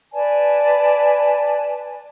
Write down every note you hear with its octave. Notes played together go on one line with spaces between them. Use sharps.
B4 D5 G#5 A5